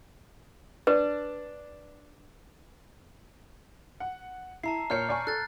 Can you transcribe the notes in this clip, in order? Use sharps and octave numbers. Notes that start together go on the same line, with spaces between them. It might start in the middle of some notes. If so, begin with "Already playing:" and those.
D4 B4
F#5
E4 A5 A#5 C7
A#2 C#5 F6 G6 C7 C#7
D5 G#5 C#6
A4 F#6 A6